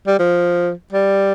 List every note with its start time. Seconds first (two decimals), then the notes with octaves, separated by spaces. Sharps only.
0.07 G3
0.19 F3
0.93 G3